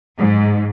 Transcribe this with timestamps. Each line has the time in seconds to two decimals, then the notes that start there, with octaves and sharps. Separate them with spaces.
0.18 G#2